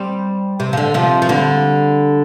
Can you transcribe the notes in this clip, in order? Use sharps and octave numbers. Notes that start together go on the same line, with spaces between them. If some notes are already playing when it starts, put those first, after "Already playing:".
Already playing: G3 C4
C3
F3
D3
C3 F3
F3
D3 G3